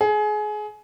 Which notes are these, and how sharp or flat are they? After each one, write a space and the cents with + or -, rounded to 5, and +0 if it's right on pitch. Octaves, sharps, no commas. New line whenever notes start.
G#4 +25